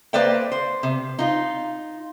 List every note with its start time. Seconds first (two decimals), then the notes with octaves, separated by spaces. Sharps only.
0.13 A#3 B4 C5 D5 E5 G5
0.51 C5
0.83 C3
1.19 D#4 F4